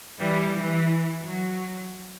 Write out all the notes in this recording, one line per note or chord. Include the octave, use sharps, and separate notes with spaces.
E3 G3
E3
F#3